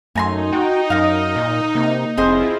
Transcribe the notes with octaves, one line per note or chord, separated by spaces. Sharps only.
F#2 A3 D#4 G#5 A#5 C6
F#4 G5
F#2 A#4 F5 D#6
A#2
C3 A#3
F1 C4 E4 F4 G#4 C5 D#5